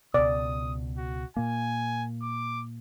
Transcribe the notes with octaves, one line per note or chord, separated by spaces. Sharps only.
C#2 B2 D5 D#6
F#4
A#2 A#3 G#5
D6